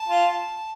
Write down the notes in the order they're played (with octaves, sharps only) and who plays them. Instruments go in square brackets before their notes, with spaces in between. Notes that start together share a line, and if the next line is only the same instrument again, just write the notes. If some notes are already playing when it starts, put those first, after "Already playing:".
Already playing: [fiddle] A5
[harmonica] F4